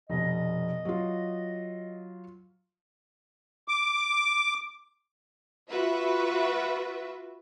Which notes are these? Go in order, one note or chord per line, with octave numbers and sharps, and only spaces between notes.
F1 B2 D#5
F#3 F4
D6
F4 F#4 B4 E5